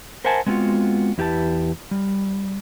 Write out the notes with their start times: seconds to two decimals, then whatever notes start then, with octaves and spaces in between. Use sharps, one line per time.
0.24 A#4 C5 E5 F#5 G#5 A5
0.46 G#3 B3 C4 D#4 F4 F#4
1.18 E2 E4 G4 B4 A5
1.91 G3